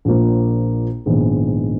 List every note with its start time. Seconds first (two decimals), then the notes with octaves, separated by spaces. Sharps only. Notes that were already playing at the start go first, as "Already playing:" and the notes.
0.05 A#1 A#2 F3 A#3
1.06 A#1 G#2 D#3 G#3 B3